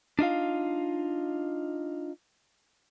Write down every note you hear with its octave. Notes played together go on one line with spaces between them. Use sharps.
D4 D#4 F4 F5